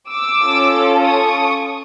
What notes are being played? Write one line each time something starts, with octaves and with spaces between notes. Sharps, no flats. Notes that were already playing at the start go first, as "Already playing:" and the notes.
D6 E6
C#4 F4 A4
C#6 D#6